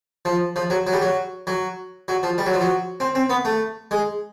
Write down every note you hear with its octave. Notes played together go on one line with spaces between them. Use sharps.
F3
F3
F#3
F#3
G3
F#3
F#3
F#3
F3
G3
F#3
F3
F#3
C4
C4
B3
A3
G#3